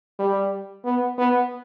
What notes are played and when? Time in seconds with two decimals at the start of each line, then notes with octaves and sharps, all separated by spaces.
0.19 G3
0.84 B3
1.18 B3